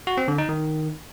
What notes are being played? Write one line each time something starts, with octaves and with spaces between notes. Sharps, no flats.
F#4
C4
D3
D#4
D#3